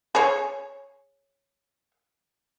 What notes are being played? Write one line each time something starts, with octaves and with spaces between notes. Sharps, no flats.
G#4 C#5